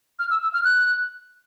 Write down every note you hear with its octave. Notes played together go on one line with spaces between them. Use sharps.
F6
E6
E6
F6
F#6